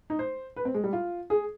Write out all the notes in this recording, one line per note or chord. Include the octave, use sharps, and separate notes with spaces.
D#4
C5
B4
C4
G#3
G3
F4
G#4